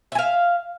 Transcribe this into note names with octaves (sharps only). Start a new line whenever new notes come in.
E5 F5 G#5